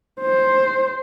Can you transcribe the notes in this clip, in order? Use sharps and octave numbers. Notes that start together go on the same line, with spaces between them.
C5